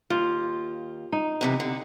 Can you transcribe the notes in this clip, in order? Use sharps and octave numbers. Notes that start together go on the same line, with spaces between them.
D#2 F4
D#4
F#2 C3 E3
D3